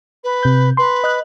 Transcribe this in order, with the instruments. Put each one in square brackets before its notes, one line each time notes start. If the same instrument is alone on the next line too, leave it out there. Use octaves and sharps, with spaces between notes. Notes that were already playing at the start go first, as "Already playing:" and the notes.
[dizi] B4
[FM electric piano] C3 G6
[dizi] B4 [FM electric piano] C6
[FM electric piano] D#5 F#6